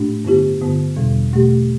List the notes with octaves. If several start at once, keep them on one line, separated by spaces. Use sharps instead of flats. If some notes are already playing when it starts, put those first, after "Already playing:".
Already playing: A2 A3 D4
G2 D3 B3 E4 G4
G2 D3 B3
E2 B2 G3
B2 A3 G4